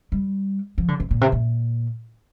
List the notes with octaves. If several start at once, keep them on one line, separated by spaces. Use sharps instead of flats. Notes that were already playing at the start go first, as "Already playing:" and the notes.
G3
F3
D3
C3
A#2
C3
A#2